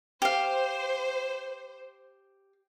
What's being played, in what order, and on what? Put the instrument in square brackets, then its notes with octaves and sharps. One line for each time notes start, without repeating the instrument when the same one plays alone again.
[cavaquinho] G4 F5 [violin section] C5